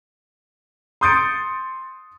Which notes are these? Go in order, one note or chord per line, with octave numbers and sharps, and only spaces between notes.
C6 D#6 G6 A6 C#7 D7